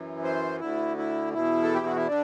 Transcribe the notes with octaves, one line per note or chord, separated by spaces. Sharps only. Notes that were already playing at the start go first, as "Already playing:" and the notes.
Already playing: F#2 E3
C5
D2 D3 E4
E4
E2 B2 E4
A4
G4
F#4
E4
D3 D4